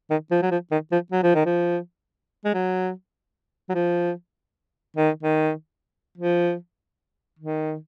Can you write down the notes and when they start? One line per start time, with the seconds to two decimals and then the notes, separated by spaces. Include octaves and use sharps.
0.10 D#3
0.31 F3
0.42 F#3
0.51 F3
0.71 D#3
0.92 F3
1.12 F#3
1.23 F3
1.35 D#3
1.46 F3
2.45 G#3
2.54 F#3
3.69 F#3
3.74 F3
4.96 D#3
5.23 D#3
6.18 F3
7.39 D#3